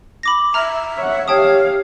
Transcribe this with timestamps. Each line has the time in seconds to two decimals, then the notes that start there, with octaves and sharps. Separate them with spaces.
0.23 B5 D6 A#6
0.54 E5 A#5 F6
0.97 C#5 F#5
1.28 G4 C#5 F5 G5 A5 D#6